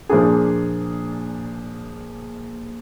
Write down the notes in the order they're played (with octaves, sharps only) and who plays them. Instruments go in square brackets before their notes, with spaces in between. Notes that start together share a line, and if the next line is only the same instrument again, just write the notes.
[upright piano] A#2 F3 A#3 D4 G#4